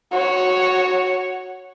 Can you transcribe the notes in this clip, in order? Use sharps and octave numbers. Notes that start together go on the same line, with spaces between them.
F#4 C#5